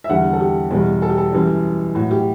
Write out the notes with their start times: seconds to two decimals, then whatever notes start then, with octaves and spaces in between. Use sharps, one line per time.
0.04 E5
0.09 E2 D3 G3 F#5
0.33 A4
0.40 G4
0.71 E2 B2 G3
1.02 A4
1.10 G4
1.17 A4
1.32 F#2 E3 G3
1.95 A2 F#3 F#4
2.11 G4